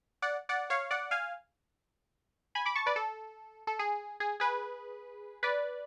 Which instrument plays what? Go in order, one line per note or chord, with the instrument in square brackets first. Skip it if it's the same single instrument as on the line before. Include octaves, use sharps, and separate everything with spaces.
[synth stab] D5 F#5
D5 F#5
C#5 F5
D5 F#5
F5 G#5
G#5 B5
B5 D6
A5 C#6
B4 D5
A4
A4
G#4
G#4
G#4 B4
B4 D5